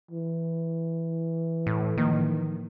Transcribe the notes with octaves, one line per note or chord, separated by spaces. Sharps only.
E3
A2
A2 D#3 F3 A#3